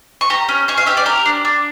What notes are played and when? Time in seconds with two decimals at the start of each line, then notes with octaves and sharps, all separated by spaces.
0.21 C#6
0.30 G4 A#5
0.49 C#4
0.68 C#4 C#6
0.78 F5
0.86 G4 E5
0.97 D5
1.06 G4 A#4
1.26 D4
1.45 D4